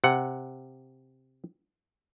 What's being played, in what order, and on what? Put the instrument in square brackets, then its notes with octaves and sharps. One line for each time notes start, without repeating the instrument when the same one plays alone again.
[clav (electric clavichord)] C3 F#5